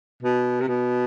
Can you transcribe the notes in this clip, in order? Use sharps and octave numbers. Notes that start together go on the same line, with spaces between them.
B2
C3
B2